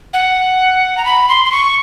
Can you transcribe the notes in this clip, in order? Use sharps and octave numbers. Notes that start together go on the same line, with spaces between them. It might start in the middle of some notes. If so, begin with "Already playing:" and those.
F#5
A#5
B5
C6
C6
C#6